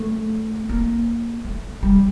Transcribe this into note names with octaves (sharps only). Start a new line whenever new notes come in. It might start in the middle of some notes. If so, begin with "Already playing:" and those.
Already playing: A3
A#3
A3
G3